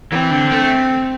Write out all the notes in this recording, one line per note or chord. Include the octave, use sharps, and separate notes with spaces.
E3 C4
D3
A3